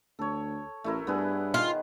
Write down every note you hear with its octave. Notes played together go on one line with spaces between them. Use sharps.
D2 A4 C#5
A1 A3 E4 A#4
G2 B3 G#4 B4
D#3 F4